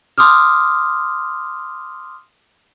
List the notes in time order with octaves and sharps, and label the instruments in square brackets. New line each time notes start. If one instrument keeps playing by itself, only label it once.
[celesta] C6 D6 D#6 F6